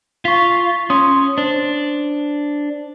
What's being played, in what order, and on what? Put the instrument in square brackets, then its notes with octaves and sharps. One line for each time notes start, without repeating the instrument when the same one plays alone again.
[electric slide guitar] F4 [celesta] C#6 B6
[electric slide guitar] C#4 [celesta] C6 D#6
[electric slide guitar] D4 [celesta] C5